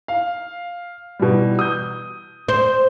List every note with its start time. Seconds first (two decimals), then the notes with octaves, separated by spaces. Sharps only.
0.08 F5
1.19 B2 E3 G3
1.59 D#6 G6
2.49 C5